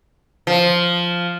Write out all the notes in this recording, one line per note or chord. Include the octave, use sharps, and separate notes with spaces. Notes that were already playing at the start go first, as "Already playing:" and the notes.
F3